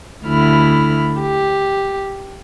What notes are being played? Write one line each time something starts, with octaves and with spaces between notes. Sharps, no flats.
D2 D3 E4 B5 F6
G4